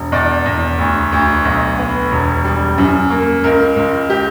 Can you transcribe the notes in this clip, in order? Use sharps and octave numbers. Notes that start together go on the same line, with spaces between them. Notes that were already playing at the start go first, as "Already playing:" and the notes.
Already playing: E1
E2 D5
E2
D2
D2
B1
B3
E1
G3
F#2
A#3
C#2 A#4
C#2
G4